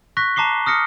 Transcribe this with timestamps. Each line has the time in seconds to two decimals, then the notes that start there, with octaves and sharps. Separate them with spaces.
0.17 C#6 F#6 A#6 B6
0.36 A5 A#5 D6 C7 G7
0.66 D#6 F6 A#6 C#7